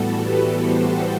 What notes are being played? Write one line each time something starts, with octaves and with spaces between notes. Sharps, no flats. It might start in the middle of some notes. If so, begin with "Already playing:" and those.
Already playing: A2 E3 G3 B3 F#4 A4
G4 B4
A4 C5